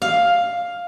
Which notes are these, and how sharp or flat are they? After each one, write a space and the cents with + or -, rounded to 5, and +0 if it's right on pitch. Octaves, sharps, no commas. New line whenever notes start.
F5 +5